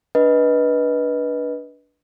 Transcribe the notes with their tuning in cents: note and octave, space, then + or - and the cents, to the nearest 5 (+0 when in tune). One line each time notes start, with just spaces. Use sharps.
D4 -10 B4 -20 D#5 +15